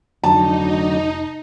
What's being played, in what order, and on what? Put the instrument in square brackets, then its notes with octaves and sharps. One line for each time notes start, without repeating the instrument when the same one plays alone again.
[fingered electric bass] F1 [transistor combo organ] D2 F#3 D4 [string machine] D#4 [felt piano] A5